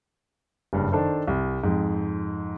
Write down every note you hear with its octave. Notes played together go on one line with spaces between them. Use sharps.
F#1 G2
D#3 D4 A4 C5
C2
F2 G#2